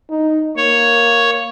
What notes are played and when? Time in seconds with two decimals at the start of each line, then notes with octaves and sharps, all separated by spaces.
0.10 D#4
0.57 A#3 C#5